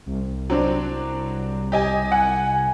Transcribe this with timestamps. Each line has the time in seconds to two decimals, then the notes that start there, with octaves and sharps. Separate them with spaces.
0.06 C2
0.50 F#3 C4 D4
1.72 G4 D#5 G#5
2.12 F#5 G#5